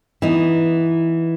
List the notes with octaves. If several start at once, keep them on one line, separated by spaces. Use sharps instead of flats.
E3 B3 D#4